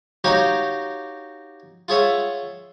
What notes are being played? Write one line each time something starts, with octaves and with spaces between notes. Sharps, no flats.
D#4 F#4 G4 C#5 D#5 F5
F4 G#4 C#5 E5 F#5